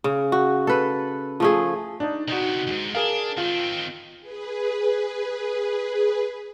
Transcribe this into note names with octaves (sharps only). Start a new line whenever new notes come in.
C#3
F#4
A4 B4
F3 A3 G#4
D4 D#4
C3 B3 D#4 F#4
D#2 G#2
D4 G#4 A#4 F5
D#3 C4 F4
G#4 B4